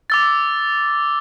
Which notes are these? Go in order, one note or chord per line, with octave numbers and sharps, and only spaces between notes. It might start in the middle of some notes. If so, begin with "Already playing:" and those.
D6 E6 A6